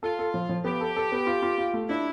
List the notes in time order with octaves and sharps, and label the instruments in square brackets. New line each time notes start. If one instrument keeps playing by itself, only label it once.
[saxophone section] F4 [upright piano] A4
[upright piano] A4
F3
F3
[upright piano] B3 [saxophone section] G4
[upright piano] A4
A4
B3
F4
F4
F4
A3
[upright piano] D4 [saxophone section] E4